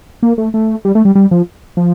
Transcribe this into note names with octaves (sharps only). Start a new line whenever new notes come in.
A#3
A3
A3
G3
A3
G3
G3
F3
F3